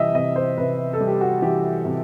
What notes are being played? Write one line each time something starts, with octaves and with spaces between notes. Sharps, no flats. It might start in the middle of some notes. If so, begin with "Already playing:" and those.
Already playing: C3 E3 G3 D#5 E5
C3 D#5
C5
C3 B4
A4
G3
G4
F#4
E3 G4
C3